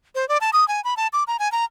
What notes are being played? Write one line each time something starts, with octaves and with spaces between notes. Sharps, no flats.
C5
D5
A5
D#6
G#5
B5
A5
D6
A#5
G#5
A#5